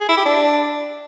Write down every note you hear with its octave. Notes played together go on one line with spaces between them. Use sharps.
G#4
E4
G4
D4